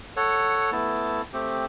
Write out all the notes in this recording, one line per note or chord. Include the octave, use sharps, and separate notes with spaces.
A4 C#5 F#5
A3 B3 E4 A5
A3 C4 G4